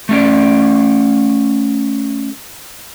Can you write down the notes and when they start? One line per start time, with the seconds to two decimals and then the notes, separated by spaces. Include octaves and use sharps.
0.09 A3 C#4 D5